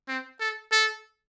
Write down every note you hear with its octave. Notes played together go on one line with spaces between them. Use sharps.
C4
A4
A4